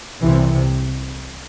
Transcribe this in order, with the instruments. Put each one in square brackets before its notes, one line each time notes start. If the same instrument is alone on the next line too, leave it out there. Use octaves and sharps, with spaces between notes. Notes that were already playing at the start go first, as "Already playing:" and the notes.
[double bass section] C2 C3 E3